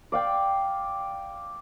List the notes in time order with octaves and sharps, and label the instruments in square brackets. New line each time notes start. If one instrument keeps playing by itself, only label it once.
[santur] D5 F5 G5